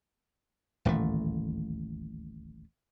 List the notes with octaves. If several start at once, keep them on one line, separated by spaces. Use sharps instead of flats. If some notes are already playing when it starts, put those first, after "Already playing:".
D#1 A1 D2 A3